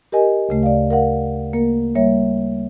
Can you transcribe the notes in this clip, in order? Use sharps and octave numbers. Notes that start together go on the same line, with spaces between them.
G4 A#4 D#5 G#5
D2 C#3 A3
D5 F5
A#4 F5 F#5
A#3 A#4
G3 A#3 C#5 E5